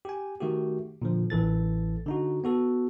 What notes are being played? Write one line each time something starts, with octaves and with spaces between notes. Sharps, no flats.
G4 G#5
D#3 A3 F#4 G4
A#2 D3 F3
A1 E3 A4 A6
D3 D#4 F#4
B3 F#4 A4